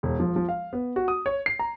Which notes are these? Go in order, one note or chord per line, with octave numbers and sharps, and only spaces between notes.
E1
F3
F3
F5
B3
F#4
D#6
C#5
C7
A#5